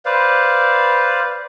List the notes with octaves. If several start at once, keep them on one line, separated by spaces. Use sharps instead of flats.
B4 C5 D5 F5